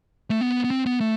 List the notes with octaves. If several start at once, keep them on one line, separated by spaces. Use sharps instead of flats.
A3
B3
B3
C4
B3
A3